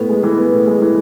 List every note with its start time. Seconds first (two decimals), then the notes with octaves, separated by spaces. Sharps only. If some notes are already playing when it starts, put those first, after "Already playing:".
Already playing: A2 B3
0.09 G#3
0.23 E3
0.37 B3
0.52 A2
0.67 G#3
0.82 E3